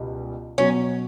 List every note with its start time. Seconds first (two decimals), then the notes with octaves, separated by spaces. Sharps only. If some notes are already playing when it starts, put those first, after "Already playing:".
Already playing: C#2 B2 G3
0.58 B2 F#3 C#4